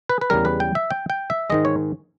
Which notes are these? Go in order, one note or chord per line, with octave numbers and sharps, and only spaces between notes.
B4
B4
E2 C#3 G3 A#4
B4
G5
E5
G5
G5
E5
G#2 D#3 G#3 D#5
C#5